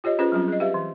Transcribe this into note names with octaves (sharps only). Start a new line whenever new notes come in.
F4 G4 C#5 D#5
C#4 F4 G#4 B4 C5
F#3 G3 C4 C#4 F4
G#4 D#5
G4 B4 E5 F5
E3